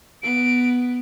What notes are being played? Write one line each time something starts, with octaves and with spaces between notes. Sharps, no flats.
B3 D7